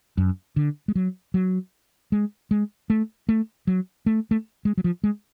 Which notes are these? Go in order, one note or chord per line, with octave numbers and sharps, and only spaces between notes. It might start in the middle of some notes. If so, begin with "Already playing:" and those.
F#2
D3
G#3
F#3
F#3
G#3
G#3
A3
A3
F#3
A3
A3
G#3
F#3
F3
G#3